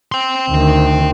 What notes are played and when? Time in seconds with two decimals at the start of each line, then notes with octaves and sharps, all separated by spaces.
0.12 G5 C6
0.50 D2 D#3